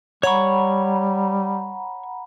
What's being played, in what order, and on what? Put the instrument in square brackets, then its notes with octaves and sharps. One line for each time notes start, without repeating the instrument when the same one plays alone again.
[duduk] G3 [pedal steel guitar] C#5 C#6 [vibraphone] F#5 A#5 B5